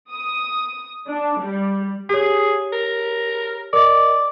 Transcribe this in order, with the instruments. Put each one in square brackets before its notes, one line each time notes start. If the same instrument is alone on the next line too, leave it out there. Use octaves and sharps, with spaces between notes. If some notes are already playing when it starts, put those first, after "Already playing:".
[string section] D#6
D4
G3
[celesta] G4 C#5 [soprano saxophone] G#4
[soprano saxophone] A#4
[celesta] A#4 D#5 [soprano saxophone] D5